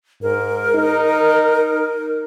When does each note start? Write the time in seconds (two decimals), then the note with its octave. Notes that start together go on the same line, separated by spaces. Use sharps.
0.22 G#2 A#4
0.75 D#4